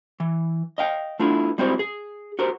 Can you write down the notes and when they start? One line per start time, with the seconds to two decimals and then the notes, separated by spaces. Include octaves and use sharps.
0.20 E3
0.78 D#5 F5 G5
1.19 A3 B3 D4 E4 F4
1.58 G3 G#3 C4 E4 F#4 C5
1.79 G#4
2.39 F#4 G4 A#4 C5